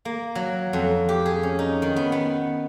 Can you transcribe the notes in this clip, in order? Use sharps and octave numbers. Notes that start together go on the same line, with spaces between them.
A#3
F#3
F2
G4
G#4
C#4
D#4
D#3
B3
B3